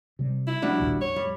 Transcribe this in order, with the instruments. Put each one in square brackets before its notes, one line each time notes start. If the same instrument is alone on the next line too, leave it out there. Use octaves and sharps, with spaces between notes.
[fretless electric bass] C3 G3
[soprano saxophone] E4
[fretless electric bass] F3 [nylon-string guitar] G3 D4 F#4
[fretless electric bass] A#1 D#2 A#2
[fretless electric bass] F2 [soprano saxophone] C#5
[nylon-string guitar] G3